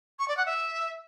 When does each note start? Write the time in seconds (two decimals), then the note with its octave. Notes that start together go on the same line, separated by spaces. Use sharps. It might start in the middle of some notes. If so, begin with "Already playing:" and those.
0.19 C#6
0.28 D5
0.37 F#5
0.46 E5